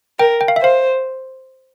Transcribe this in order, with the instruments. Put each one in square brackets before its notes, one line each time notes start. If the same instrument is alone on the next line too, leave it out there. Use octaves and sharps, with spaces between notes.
[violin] A#4 [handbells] G5
[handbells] G5
F5
E5
[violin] C5 [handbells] F5